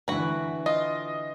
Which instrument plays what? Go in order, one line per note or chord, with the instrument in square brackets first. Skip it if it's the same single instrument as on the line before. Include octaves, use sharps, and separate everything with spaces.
[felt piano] D3 E3 [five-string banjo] F#4 B4
[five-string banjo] F4 [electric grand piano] D#5